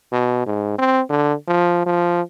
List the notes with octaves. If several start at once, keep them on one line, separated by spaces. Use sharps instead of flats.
B2
G#2
C4
D3
F3
F3